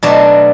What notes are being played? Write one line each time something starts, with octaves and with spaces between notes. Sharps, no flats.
B2 F#3 A3 D4